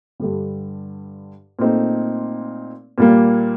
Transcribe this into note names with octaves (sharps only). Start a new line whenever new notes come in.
G2 D3 G3
A#2 A3 C4 D#4
A#2 G3 A#3